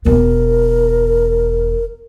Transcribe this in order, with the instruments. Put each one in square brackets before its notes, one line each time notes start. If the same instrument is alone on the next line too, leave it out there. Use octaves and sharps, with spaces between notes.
[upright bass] E1 B3 [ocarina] A#4